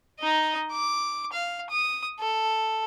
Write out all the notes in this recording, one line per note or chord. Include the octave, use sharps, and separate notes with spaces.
D#4 D#5
D6
F5
D#6
A4